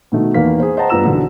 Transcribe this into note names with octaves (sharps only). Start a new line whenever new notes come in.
B2 D#3 A3 D#4
E2 D#3 A#3 B4 F5 B6
G#4 C5
C5 D#5 F#5 G5 A5 A#5
G2 B3 F4 A#5 E6 E7
B1 D3 E3 F#3